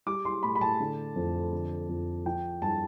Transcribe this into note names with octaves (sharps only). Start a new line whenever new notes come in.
G3 D6
C6
A2 B5
B5
A5
D3
F2
D3
F2
F3 G5
G2 A5